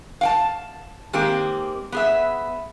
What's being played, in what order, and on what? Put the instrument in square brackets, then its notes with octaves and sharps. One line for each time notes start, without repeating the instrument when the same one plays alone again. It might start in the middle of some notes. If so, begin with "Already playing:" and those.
[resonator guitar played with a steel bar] F5 G5 A5
D#3 G#3 A#3 C4 G4 G#4
B3 G#4 E5